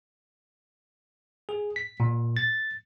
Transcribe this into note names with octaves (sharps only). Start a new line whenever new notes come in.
G#4
B6
A#2
A6